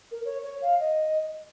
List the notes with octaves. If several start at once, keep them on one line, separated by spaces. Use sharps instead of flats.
A#4
C#5
C#5
F5
D#5